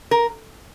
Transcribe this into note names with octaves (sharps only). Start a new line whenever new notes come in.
A#4